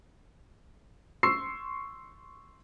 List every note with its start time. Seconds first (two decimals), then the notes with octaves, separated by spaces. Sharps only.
1.23 C6 C#6 E6 C7